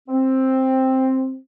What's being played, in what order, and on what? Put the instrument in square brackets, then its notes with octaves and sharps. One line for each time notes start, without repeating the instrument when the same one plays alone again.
[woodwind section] C4